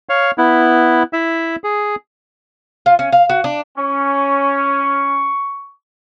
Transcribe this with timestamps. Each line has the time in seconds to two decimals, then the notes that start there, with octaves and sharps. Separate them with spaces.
0.09 C#5 F5
0.38 B3 E4
1.13 E4 E5
1.64 G#4
2.86 F4
2.99 C#4
3.12 F5
3.29 F#4
3.44 D4
3.77 C#4 C#6